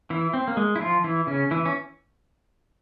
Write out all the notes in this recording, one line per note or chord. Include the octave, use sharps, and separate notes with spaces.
E3 E4
C4
A#3
G#3
E4
F3 F4
E3 E4
C#3 C#4
E3 E4
C#4